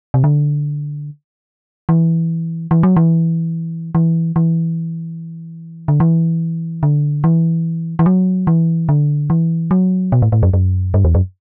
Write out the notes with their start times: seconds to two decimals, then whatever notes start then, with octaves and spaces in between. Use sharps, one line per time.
0.14 C3
0.24 D3
1.89 E3
2.71 E3
2.83 F#3
2.96 E3
3.95 E3
4.36 E3
5.88 D3
6.00 E3
6.83 D3
7.24 E3
7.99 E3
8.06 F#3
8.47 E3
8.89 D3
9.30 E3
9.71 F#3
10.12 B2
10.22 A2
10.32 A2
10.43 F#2
10.54 F#2
10.94 G2
11.04 E2
11.15 F#2